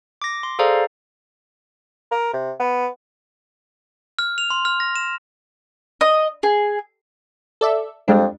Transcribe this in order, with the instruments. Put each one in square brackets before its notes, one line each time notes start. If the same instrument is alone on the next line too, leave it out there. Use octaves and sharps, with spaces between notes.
[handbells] D6 A#6
C6
G#4 A4 C5 D5 F5 A#5
[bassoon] A#4
C3
B3
[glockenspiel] F6
F7
C6
F6
A#6
E7
[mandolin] D#5
G#4
[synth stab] A4 D5 E5
[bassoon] F2 [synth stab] G3 G#3 D4